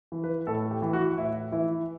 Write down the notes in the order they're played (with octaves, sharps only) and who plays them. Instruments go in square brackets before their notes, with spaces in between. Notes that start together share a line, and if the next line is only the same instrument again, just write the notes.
[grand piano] E3
B4
A2 A4
G4
E3
F#4
A2 E4
E3 E4